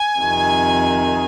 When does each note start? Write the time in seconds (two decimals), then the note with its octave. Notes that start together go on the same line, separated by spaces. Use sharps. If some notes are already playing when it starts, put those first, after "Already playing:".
Already playing: G#5
0.20 F2 C3 D#3